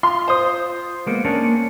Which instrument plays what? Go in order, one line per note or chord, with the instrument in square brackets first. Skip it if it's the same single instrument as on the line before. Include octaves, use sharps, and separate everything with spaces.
[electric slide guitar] F4 [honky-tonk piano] C6
[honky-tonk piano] C5 D#6
[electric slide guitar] G#3 A#3 B3
A#3 C#4 D4